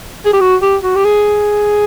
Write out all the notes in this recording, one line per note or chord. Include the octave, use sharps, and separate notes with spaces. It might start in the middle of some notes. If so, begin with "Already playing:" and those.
G#4
G4
F#4
G4
F#4
G4
G#4